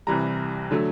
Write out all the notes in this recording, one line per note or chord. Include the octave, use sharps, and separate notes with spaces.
C2 C3 E3 G3 A#5
D3 F#3 A3